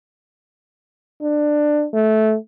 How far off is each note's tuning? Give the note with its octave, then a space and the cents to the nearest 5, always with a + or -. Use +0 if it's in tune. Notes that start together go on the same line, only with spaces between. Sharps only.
D4 +15
A3 -15